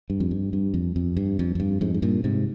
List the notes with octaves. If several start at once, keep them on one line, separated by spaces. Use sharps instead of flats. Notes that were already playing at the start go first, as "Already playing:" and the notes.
G2
F2
G2
G2
F2
F2
G2
F2
F2
G2
F2 G#2
G#2
G2 A#2
G#2 C3